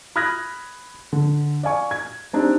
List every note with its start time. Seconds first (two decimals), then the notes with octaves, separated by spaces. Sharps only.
0.16 B5 D#6 F6 F#6 G#6 A#6
1.13 D3
1.63 D5 F5 G#5 C#6
1.91 G#6
2.33 C4 D4 D#4 G4